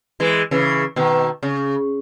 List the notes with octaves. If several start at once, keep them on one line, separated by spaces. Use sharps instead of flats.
E3 G#3
C#3 E3
B2 D#3
C#3